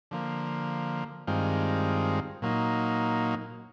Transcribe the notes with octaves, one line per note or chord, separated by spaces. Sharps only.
D3 F3 A#3
G2 D#3 G#3 C4 F4
A#2 F#3 A#3 D#4